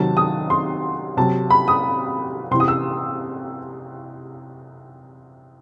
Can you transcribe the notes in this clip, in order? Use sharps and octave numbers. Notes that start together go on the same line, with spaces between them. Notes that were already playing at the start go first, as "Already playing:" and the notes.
Already playing: C3 D#3 F#3 A5
D#6
C6
C3 F#3 A5
B5
D#6
C3 E3 C6
D#6
E6